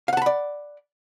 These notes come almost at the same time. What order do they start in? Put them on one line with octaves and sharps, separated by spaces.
F5 F#5 A5 B5 D5